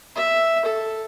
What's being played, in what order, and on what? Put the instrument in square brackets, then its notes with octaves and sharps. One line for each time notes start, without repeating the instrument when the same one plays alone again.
[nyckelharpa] E5
A4